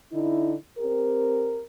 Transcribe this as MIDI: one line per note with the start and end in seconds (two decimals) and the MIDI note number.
0.12 0.53 50
0.12 0.53 63
0.12 0.53 64
0.78 1.62 60
0.78 1.62 67
0.78 1.62 70